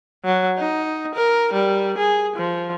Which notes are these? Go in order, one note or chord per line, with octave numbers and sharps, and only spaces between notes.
F#3
D#4
A#4
G3
G#4
F3